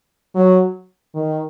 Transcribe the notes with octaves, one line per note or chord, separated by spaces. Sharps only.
F#3
D#3